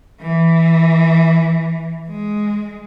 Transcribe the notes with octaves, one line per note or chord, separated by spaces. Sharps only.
E3
G#3